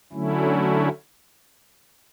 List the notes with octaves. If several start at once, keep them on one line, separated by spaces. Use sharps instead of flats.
D3 F#3 A3 C#4 E4